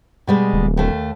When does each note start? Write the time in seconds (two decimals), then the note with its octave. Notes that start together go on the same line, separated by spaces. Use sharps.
0.27 B2 G3 G#3
0.53 D1
0.77 D#2 A3